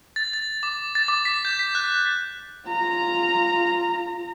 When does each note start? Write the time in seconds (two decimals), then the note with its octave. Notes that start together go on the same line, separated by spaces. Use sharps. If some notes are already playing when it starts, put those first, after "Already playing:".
0.16 A6
0.33 A6
0.63 D6
0.95 A6
1.08 D6
1.25 B6
1.45 G6
1.59 B6
1.75 F#6
2.66 F4 A#5